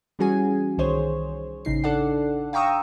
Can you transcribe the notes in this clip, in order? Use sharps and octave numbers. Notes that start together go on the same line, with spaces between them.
E3 G3 C#4 F#4 G#4 G#5
C2 D#3 G#4 C5 C#5
A1 C#3 D#4 C7
D4 A4 D5 F#5
F5 G5 A#5 C#6 D#6 E6